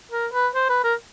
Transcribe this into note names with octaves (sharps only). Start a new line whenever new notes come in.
A#4
B4
C5
B4
A#4